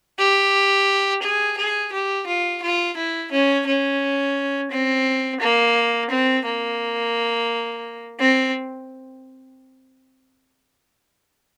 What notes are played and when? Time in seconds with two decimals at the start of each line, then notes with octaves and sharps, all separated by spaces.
0.19 G4
1.22 G#4
1.58 G#4
1.92 G4
2.27 F4
2.62 F4
2.97 E4
3.32 C#4
3.67 C#4
4.71 C4
5.41 A#3
6.10 C4
6.45 A#3
8.20 C4